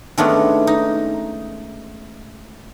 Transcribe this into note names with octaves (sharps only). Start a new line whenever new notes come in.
D#3 G#3 A3 B3 C#4 D4
D#4